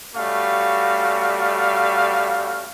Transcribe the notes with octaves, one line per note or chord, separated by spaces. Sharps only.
G3 A3 C#4 F#4 F5